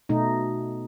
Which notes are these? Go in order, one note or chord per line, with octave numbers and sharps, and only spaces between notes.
B2 A3 D#4